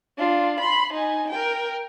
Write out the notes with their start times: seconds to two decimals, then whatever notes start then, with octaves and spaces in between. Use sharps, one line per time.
0.18 D4 F4
0.59 B5 C6
0.93 D#4 G#5
1.30 A#4 G5